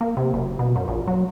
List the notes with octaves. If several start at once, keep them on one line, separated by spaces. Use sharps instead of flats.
A#3
C3
F#1
B2
F#2
A#1
F#3